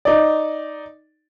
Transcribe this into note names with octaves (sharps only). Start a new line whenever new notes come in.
D#4 D5